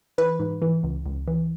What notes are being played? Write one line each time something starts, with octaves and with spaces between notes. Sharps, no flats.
E3 B4
G#2
E3
C#2
C#2
E3